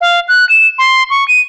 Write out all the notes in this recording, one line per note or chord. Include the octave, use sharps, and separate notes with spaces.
F5
F#6
E7
C6
C#6
D#7